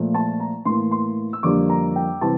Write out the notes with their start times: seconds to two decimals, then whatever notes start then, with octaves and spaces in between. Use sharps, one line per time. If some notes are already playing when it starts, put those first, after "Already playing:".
Already playing: A#2 F3 A3
0.14 A5
0.40 A#5
0.65 A2 E3 A#3 C6
0.91 C6
1.33 E6
1.43 F2 D3 G3 A#3 D4 D6
1.70 A#5
1.96 G5
2.21 C3 E3 G3 C4 A5